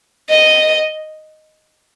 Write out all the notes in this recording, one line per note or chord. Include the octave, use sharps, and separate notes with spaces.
D#5